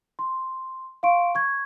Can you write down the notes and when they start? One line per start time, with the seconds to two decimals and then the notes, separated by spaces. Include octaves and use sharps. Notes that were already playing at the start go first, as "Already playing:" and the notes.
0.19 C6
1.03 F5 C6 C#6 D7
1.35 C#6 G#6